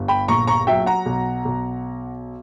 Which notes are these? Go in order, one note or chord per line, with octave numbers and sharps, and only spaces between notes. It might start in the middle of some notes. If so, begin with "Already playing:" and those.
Already playing: G1 G2
G5 B5
A#1 A#5 C#6
A#5 C#6
F#3 E5 G5
F#5 A#5
B1
B1